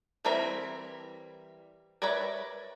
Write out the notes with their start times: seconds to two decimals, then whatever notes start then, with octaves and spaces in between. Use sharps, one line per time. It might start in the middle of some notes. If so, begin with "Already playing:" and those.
0.25 E3 G3 C4 A#4 E5
2.02 A#4 B4 C#5 D5 E5